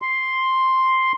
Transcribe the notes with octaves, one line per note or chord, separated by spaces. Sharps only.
C6